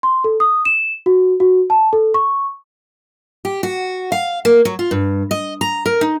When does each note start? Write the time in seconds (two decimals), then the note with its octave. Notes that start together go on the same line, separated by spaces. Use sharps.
0.03 C6
0.24 A4
0.40 D#6
0.65 E7
1.06 F#4
1.40 F#4
1.70 A5
1.93 A4
2.14 C#6
3.45 G4
3.63 F#4
4.12 F5
4.45 A#3
4.65 F#3
4.79 F4
4.91 G2
5.31 D#5
5.61 A#5
5.86 A#4
6.01 D#4